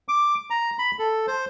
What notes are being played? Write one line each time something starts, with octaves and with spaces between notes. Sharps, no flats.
D6
A#5
B5
A4
C5